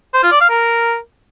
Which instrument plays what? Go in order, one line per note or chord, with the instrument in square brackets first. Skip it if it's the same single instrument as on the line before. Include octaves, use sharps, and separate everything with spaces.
[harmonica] C5
F4
D5
F5
A#4